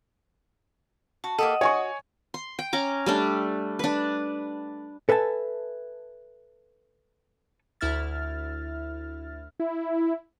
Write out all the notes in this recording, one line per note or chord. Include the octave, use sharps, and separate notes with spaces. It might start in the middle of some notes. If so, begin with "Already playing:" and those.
F#4 A5
A#3 G4 A4 D#5 F#5 D#6
F#4 C#5 G#5 C#6
C6
G5
C#4 A#5 D6
G3 A3 D4
D4 B4
A4 B4 E5 G#5 A5
D2 E4 E5 F6 A6
E4